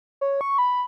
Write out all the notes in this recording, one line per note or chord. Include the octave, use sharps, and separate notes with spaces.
C#5
C#6
B5